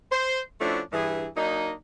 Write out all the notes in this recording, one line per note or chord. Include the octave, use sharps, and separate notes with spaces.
C5
F3 A3 C#4 D4 E4 F#4
G2 E3 G#4
F#3 A#3 D4 D#4